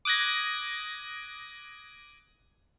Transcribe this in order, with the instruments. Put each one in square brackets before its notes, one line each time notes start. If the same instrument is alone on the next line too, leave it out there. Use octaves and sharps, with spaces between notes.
[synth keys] D6 D#6 F#6 G#6 A#6